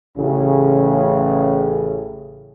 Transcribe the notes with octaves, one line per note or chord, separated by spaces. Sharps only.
A1 C#3